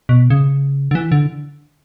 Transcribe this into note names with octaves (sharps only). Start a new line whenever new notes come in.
B2
C#3
D3
E3
D3